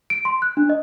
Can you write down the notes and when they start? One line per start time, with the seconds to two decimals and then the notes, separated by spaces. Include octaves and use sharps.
0.10 D7
0.25 C6
0.42 F#6
0.57 D4
0.69 D#5